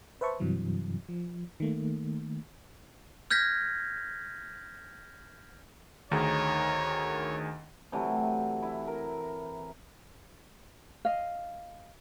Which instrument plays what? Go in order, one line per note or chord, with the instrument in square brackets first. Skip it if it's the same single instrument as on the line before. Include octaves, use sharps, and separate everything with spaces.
[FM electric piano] B4 C5 E5 A5 C#6
G2 C3 E3 F#3
F3
D#3 A3 A#3
[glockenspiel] F6 G6 G#6 A#6 B6
[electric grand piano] D2 G#4 [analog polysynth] D#3 [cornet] C#5 [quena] A#5
[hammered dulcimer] C3 E3 F#3 A3
E4
A#4
[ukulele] D#5 F5